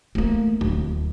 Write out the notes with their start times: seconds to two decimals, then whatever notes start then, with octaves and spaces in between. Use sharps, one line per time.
0.15 A3 A#3
0.61 D1